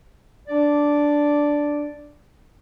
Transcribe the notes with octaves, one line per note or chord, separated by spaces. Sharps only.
D4 D5